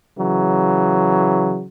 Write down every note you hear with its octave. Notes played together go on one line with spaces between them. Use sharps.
C#3 E3 F#3